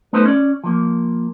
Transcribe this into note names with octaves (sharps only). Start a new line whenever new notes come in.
A3 B3 D#4 A4 B4 C5
C#4 D5
F3 A#3